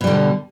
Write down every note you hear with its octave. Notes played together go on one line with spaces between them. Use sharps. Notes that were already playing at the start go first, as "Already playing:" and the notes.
B2 D3 G3